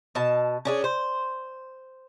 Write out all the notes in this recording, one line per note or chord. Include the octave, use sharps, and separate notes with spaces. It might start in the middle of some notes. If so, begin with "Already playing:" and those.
B2 A5
C#4 D4 G#4
C5